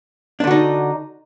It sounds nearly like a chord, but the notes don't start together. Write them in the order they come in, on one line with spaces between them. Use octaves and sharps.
D4 D3 F#4 D#4